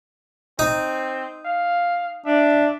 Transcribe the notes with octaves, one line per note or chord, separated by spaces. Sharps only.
C4 D#4
F5
D4 E5